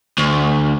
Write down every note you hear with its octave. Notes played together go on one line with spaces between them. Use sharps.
D2